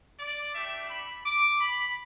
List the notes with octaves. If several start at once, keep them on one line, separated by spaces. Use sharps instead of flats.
D5
A3 D4 G4 E5
B5
D6
B5